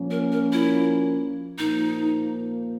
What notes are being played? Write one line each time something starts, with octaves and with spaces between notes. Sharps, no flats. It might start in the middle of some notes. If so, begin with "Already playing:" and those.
Already playing: A#2 F3 A#3 C#4
A#4
A#4
E4
A#2 F3 A#3 D#4